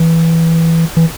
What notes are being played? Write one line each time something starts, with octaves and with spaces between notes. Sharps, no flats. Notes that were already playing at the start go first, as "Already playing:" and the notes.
Already playing: E3
E3